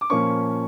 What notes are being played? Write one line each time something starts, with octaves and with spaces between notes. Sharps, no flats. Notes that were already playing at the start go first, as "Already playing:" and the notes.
D6
A#2 F3 A#3 C#4 C#6